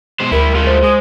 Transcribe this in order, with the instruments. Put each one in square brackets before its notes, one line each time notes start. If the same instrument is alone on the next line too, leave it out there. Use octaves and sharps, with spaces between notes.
[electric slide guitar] B2 G#3 C5
[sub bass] D2 [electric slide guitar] G3 G#3 E4 [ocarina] A#4
[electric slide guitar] G#3 A3 F4
[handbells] C5
[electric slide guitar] G#3 [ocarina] D#6